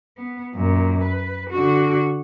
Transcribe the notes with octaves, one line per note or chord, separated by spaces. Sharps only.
B3
F#2 A#2
B4
D3 F#4